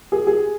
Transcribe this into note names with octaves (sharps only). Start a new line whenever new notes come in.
G#4
G#4